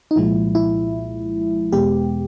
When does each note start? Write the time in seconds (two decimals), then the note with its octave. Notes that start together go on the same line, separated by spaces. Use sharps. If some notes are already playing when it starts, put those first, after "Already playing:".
0.11 D#4
0.16 C2 A#2 F3 G#3 E4
0.55 E4
1.72 E2 B2 G#3 B3 G4